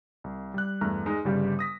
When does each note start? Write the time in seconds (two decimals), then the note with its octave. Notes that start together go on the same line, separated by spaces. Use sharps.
0.24 C2
0.54 G3 F#6
0.81 E2 G2 A3 A#5 F6
1.06 G#3 D#4
1.25 G1 C#3 G3 G4 F5
1.59 D#6 A#6 B6